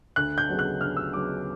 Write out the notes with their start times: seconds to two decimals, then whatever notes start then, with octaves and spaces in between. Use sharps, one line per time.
0.16 D2 F#6
0.38 G6
0.49 C#3 F#3 B3
0.59 F#6
0.81 D2 F6
0.97 E6
1.13 C#3 F#3 B3 D6